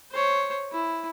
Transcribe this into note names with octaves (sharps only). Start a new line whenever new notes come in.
C5 C#5
E4